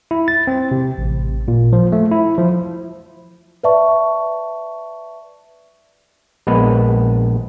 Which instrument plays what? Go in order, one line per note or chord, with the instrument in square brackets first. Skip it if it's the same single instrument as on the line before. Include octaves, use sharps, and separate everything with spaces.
[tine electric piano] E4
A6
C4
C3
A1
A#2
F3
A3
E4
F3
[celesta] B4 D5 E5 A5 C#6
[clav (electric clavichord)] A#1 G#3 B3 B4